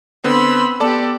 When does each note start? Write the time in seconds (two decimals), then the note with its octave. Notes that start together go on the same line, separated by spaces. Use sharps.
0.24 D3 B3 C4 B5 C6 E6
0.80 B3 G4 A4 D5 A5